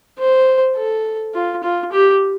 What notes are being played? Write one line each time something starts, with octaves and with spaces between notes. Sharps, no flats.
C5
A4
F4
F4
G4